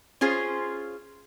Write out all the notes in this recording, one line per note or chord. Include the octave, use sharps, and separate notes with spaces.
C#4 F4 G#4 C5